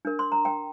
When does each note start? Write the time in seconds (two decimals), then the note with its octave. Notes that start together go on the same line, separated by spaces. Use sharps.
0.05 D4 A#4
0.19 C6
0.32 A#5
0.45 G5